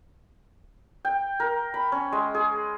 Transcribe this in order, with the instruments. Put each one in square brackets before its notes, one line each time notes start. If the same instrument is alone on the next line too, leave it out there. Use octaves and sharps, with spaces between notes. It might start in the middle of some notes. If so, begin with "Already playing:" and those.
[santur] G5
A#4
B5
C#4
G#3
G#4